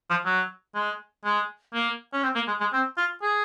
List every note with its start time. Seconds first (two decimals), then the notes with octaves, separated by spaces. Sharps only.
0.10 F3
0.26 F#3
0.75 G#3
1.25 G#3
1.74 A#3
2.13 C#4
2.23 C4
2.36 A#3
2.48 G#3
2.61 G#3
2.73 C4
2.97 F4
3.22 G#4